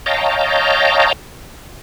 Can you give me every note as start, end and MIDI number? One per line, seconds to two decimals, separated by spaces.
0.06 1.13 73
0.06 1.13 75
0.06 1.13 77
0.06 1.13 79
0.06 1.13 81
0.06 1.13 82